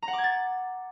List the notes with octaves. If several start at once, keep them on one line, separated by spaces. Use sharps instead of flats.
A#5
F#5
D6
G#6
A6